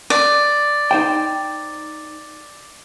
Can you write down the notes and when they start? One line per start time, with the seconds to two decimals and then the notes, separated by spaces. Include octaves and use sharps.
0.10 D5
0.91 D#4 C5 G5